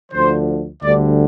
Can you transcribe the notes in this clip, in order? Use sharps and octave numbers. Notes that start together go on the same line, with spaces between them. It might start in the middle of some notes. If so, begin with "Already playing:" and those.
D2 D3 F3 C5
D2 D3 G3 D5